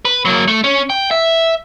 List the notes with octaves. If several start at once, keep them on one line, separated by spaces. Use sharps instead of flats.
B4
F#3 A#3
A3
C#4
G5
E5